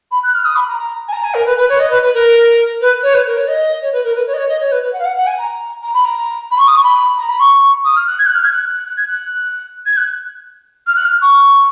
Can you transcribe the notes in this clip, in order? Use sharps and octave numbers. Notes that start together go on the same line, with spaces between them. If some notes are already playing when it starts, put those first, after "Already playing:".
B5
F#6
F6
D#6
B5
A#5
A#5
G#5
A#5
G#5
A#4
B4
B4
C#5
D#5
B4
B4
A#4
B4
C#5
B4
A#4
C#5
D#5
C#5
B4
A#4
B4
C#5
D#5
C#5
D#5
C#5
B4
B4
F#5
F5
F#5
F#5
G#5
A#5
A#5
B5
A#5
B5
C#6
D#6
C#6
B5
A#5
B5
C#6
D#6
F6
F#6
G#6
F#6
F6
G#6
F#6
F#6
F#6
G#6
F#6
G#6
F#6
F6
F#6
F6
C#6